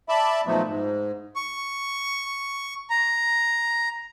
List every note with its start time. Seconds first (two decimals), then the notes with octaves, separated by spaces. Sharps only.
0.09 D5 E5 A5 B5
0.46 A#2 D#3 F3 F#3 A3 B3
0.67 G#2
1.36 C#6
2.90 A#5